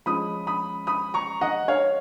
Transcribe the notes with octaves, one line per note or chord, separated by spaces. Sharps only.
F3 G#3 C#4 B5 D#6
B5 D#6
B5 D#6
A#5 C#6
D#5 F#5
C#5 F5